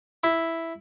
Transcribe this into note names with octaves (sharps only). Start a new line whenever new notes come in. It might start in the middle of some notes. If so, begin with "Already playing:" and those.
E4